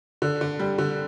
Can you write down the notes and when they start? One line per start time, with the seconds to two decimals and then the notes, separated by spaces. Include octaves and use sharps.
0.22 D3
0.41 D3
0.59 G3
0.78 D3